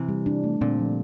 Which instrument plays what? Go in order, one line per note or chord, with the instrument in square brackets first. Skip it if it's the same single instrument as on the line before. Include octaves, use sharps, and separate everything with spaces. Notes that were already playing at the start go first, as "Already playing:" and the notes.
Already playing: [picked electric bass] C3 E3 [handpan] C4
[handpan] G3
D4
A3
[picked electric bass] A#2 D3 [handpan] C4
[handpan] F3